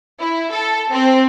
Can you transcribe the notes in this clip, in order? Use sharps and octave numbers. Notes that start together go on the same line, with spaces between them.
E4
A4
C4